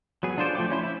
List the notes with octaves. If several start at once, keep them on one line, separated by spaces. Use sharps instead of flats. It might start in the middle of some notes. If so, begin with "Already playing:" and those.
F#3 B3 G#4
D4 F4 A4 C5 D5
F3 A3 G5 D6
C#4 E4 C5
E4 E5